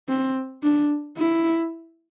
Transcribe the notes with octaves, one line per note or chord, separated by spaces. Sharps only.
C4
D4
E4